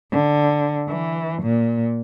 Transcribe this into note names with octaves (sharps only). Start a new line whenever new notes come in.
D3
E3
A#2